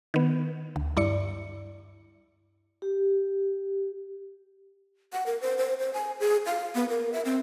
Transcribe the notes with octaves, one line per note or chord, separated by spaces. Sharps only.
D#3 B3
D2
G2 E4 D5 C#7
G4
F#5
A#4
C5
C5
C5
G#5
G#4
F5
B3
A#4
E5
C4